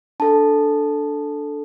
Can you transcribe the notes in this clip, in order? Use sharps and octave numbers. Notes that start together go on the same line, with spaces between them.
D4 A4 A5